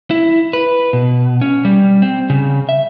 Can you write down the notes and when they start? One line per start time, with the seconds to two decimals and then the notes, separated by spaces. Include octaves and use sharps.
0.11 E4
0.53 B4
0.93 B2
1.42 C#4
1.65 G3
2.02 C4
2.30 C#3
2.69 E5